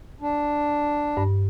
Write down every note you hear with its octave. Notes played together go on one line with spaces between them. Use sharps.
D4
G2